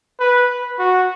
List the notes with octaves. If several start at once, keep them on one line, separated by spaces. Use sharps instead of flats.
B4
F#4